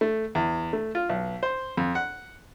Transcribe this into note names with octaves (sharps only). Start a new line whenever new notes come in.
A3
E2
A3
F4
B1
C5
F2
F#5